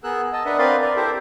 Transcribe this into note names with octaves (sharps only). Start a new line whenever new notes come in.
B3 G#4 A#4 E6 F#6
D#5 A5 E6
D4 A#4 B4 D#5 E5 F#5
C4 A#4 B4 D5 F5 C6
A#4 D5
E4 G4 A4 A#4 C5 E5